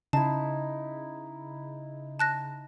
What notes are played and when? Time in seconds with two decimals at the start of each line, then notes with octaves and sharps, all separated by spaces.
0.13 C#3 D#4 E4 A5
2.19 A5 F#6 A#6